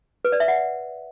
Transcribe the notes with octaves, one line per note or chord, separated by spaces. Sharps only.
B4
D5
E5
F#5